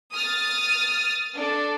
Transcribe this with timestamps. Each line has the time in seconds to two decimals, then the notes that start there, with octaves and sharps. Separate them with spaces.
0.13 D#6 F6 A6
1.35 D4 A4